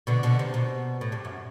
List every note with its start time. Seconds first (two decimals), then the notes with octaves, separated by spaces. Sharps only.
0.07 B2 D3
0.23 B2 D3
0.39 C3
0.54 B2
1.01 A2
1.12 G2
1.25 F#2